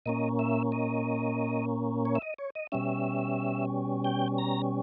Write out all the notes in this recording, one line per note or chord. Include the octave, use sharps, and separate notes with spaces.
A#2 A#3 C#4 D#5
E5
D#5
C#5
E5
D#5
C#5
D#5
B2 G3 C#4 E5
G5
A#5